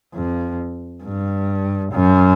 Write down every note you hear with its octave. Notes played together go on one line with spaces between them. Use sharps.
F2
G2
F#2